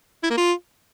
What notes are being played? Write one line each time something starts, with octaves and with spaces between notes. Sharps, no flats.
E4
A#3
F4